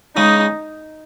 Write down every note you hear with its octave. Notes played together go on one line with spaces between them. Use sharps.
C#3 G#3 D#4